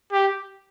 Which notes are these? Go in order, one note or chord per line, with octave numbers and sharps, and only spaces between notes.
G4